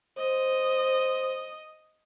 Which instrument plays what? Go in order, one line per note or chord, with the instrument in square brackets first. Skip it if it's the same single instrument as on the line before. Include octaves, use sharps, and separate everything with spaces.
[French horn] C5 [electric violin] D#5